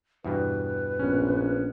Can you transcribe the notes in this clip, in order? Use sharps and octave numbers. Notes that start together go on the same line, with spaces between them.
E2 G2 B2 B4
A#1 B3 C#4